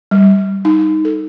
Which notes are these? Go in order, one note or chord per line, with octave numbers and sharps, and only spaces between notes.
G3
D#4
A4